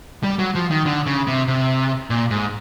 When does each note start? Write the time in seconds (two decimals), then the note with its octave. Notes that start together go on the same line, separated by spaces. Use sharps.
0.23 G3
0.39 F#3
0.55 F3
0.71 D#3
0.86 D3
1.06 C#3
1.27 C3
1.48 C3
2.10 A#2
2.31 G#2